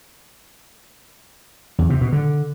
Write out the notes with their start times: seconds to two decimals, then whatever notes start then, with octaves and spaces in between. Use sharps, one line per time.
1.79 E2
1.90 C3
2.01 B2
2.13 D3